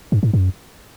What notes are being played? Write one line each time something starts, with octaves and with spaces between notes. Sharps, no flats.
G2
G#2
F#2